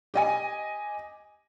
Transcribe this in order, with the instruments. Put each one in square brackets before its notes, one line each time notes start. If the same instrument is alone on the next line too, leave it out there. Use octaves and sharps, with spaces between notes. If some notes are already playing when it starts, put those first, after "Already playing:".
[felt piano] G4 D#5 G#5